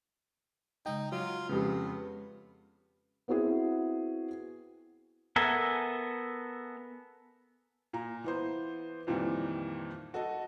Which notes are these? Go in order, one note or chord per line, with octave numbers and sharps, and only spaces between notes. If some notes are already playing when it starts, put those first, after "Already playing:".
C#3 G#3 D#4 D#5 G5
F#3 F4
F2 C#3 G#3 B3 G4
B3 C4 E4 F#4 G#4
B3 A4 A#4 E5 G#5
A#2 A#5
E3 B3 C5
F2 A#2 D#3 E3 G3
F#4 A4 D#5